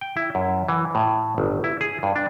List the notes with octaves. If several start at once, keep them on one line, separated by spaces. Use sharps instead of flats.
G5
E4
F#2
E3
A2
G1
E4
G#4
G2
D4